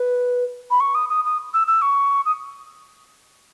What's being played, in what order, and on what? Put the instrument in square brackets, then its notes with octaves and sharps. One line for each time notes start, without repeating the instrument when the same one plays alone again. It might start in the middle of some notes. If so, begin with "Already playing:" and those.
Already playing: [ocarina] B4
B5
C#6
D#6
D#6
D#6
E6
E6
C#6
D#6